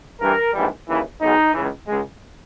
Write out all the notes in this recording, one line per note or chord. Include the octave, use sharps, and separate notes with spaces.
G2 E3 G3 A#4
A#1 G#2 E3 G3
D#2 C#3 E3
B1 B2 G#3 D#4
C#2 C#3 E3
C#2 C#3 G#3